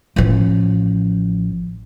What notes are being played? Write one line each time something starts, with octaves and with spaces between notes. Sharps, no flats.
A1 F3